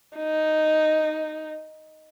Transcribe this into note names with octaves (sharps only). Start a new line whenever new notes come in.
D#4